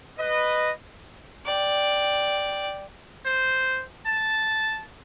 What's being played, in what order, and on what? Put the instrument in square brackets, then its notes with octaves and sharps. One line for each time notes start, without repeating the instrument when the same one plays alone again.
[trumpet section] B4 D#5
[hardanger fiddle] D5 G5
[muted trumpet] C5
A5